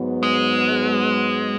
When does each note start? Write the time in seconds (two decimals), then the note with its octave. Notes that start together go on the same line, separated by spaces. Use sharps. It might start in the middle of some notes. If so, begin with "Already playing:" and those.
Already playing: G#2 F#3 B3
0.23 G#3